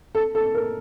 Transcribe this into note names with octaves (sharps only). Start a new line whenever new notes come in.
A4
A4
A#4